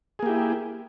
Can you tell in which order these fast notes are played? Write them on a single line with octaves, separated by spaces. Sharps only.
G#4 A#3 G4 E4